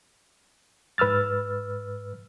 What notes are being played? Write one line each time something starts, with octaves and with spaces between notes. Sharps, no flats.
G#2 B4 E6 F6 A6